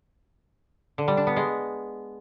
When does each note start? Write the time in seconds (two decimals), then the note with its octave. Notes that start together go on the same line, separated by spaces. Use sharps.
0.98 D3
1.08 G3
1.17 D4
1.27 B3
1.36 G#3